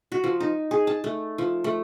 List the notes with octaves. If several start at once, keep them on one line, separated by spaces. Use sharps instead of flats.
F#4
F3
D#4
G#4
A5
A3
F3
A3